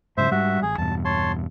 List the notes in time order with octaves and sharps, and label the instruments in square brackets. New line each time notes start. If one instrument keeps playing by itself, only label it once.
[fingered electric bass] G#2 C#3 F#3 [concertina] C5 E5
[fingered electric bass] G#2 G3 [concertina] F#4 E5
[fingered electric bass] A1 [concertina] G#4
[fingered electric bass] E2 G2 B2 [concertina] A5
[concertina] C#5 A5 C6